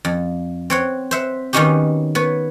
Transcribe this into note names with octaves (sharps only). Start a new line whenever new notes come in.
F2
C4 C#5 F#5
C5 E5 F#5
D#3 B3 C#4 D#4 F#4 G4
B3 B4 C#5